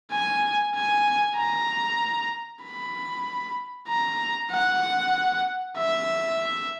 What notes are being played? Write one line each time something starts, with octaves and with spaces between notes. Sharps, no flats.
G#5
G#5
A#5
B5
A#5
F#5
E5